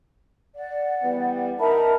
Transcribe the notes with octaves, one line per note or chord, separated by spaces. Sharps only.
D5 F#5
E3 G3 B3
B3 D#4 A#4 E5 A5 B5